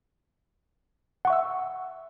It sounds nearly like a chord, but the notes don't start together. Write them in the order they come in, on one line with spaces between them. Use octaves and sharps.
F#5 C#6 E5 E6